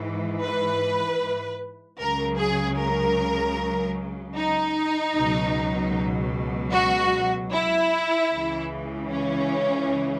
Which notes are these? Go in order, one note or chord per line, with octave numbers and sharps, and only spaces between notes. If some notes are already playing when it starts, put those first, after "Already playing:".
Already playing: G#2 E3
B4
C#2 C#3 F#3 A#4
G#4
A#4
D#4
C#2 B2 F#3
F#4
E4
C#2 C#3 E3
C#4